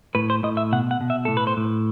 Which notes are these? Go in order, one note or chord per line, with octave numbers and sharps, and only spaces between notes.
A2 B4
C5
A2 D#5
E5
B2 F#5
F#5
B2
E5
A2 A4
B4
C5
A2